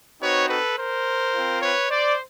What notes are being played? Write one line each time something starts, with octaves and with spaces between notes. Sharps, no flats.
C4 D#4 F#4 B4 C#5
A4 B4
A#4 C5
C4 F4
B4 C#5
C5 D5